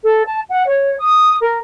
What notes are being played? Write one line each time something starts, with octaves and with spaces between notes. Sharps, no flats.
A4
A5
F#5
C#5
D#6
A#4